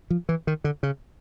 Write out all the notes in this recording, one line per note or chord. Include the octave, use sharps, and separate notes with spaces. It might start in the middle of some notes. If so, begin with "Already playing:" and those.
F3
E3
D#3
D3
C#3